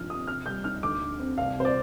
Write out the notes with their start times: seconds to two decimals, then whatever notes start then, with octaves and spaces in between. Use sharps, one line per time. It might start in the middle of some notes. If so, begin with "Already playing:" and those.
Already playing: G2 F3 D#4 F6
0.09 C4 D#6
0.27 C3 F6
0.46 G3 G6
0.64 D#4 F6
0.83 D2 D6
1.01 D3
1.19 C4
1.38 C2 F5
1.57 C3 C5
1.65 D5